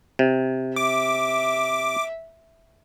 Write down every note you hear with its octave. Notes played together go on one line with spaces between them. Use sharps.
C3
E5 D6